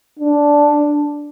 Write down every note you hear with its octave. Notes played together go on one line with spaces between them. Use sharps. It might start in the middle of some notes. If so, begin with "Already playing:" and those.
D4